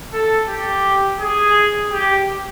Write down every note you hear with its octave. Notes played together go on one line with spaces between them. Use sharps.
A4
G4
G#4
G4